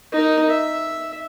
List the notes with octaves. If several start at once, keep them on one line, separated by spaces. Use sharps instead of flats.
D#4 A#4
E5